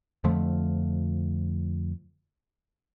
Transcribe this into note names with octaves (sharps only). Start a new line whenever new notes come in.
F2 D3 F3 A3